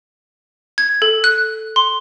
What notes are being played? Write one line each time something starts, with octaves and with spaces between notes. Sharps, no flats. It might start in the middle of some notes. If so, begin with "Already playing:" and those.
G#6
A4
F#6
C6